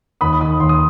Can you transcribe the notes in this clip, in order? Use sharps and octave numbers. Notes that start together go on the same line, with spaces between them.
D#2 B5 D#6
D#3 B5 D#6
D#2 C6
D#6